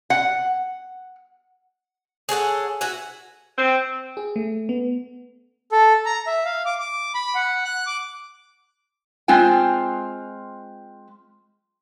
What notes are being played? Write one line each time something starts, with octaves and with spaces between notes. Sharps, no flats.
F#5
G#4 A4 C#5 F#5
F#4 E5 F#5 G#5
C4
G#4
A3
B3
A4
A#5
E5
F5
D6
D6
B5
F#5
F#6
D6
G#3 C4 F4 G5 G#5